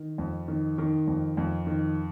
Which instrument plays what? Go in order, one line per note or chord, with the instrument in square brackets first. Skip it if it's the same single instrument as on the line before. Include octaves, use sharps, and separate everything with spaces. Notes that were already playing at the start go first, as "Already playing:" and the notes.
Already playing: [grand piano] D#3
F2
D#3
D#3
F2
F2
D#3